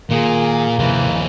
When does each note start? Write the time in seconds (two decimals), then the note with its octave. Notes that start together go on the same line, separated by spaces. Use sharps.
0.11 A#2 D#3 A#3 G#4
0.79 D#2 C3 E3 F3